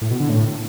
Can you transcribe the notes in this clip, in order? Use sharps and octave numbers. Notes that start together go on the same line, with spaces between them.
A2
B2
D3
A2